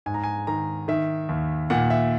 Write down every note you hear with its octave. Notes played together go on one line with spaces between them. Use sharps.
G#2 G#5
A#5
G#5
D#3 A#5
D#3 E5
D#2
A#2 F#5
E5